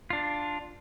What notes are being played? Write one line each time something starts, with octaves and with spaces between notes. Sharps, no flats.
D4 F4